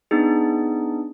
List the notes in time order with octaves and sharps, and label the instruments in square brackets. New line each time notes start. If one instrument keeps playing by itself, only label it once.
[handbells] B3 D4 D#4 G#4